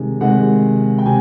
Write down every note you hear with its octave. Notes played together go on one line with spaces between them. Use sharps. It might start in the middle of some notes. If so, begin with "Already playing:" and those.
Already playing: C3 D#3 G#3
C3 D#3 G#3 F#5
G5
C3 G#5